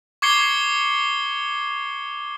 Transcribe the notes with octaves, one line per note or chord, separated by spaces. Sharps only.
C#6 D6 G#6 C7 C#7 G7